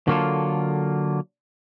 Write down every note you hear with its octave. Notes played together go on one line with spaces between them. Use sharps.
D3 F#3 A#3 B3 F4 A4